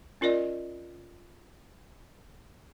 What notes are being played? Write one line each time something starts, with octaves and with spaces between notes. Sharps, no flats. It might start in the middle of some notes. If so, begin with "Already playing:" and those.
C#4 F4 A#4 D5 D#5